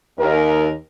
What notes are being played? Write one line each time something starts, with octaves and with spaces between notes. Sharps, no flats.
D#2 A#4